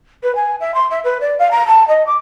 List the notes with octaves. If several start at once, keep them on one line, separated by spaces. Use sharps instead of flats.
B4
G#5
E5
C6
E5
B4
D5
F5
A#5
A5
D#5
D6